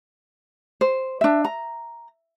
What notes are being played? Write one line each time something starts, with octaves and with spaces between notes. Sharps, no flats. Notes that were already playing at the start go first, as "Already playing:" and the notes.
C5
D4 E5
A#5